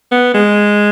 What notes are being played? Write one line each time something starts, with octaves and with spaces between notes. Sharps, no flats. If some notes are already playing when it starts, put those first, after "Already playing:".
B3
G#3